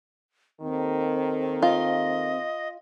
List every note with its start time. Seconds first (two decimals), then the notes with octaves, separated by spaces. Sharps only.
0.61 D#2 D#3 C4 A4
1.62 F4 D#5